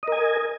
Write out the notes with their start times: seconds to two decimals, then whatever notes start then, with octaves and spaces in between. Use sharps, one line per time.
0.03 D#5
0.08 A#4
0.12 G#5